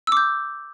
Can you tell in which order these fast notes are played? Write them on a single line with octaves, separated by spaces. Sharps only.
E6 D6 G6